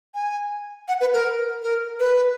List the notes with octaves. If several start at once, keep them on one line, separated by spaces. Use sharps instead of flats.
G#5
F#5
B4
A#4
A#4
B4